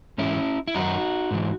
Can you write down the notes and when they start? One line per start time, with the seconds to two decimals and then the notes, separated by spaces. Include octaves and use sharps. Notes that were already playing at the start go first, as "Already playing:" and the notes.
0.18 G#2 E3 C#4 E4
0.68 E4
0.75 F#2 D#3 F#3 D#4 F#4
1.31 G#2 E3